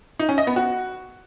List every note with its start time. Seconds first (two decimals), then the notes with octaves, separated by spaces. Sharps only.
0.19 D#4
0.29 C#4
0.38 D#5
0.47 B3
0.56 F#4